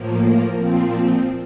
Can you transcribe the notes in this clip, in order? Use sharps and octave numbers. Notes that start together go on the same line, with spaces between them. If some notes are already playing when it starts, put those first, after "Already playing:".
Already playing: A2 F3 A#3
A#4
A#2 F3 C4